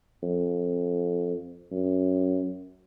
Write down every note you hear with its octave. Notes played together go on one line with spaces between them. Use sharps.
F2
F#2